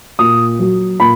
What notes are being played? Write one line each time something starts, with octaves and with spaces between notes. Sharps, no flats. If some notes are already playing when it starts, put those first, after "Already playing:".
A#2 D#6
F#3
A#2 B5